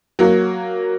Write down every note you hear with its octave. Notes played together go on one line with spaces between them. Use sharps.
F#3 A#3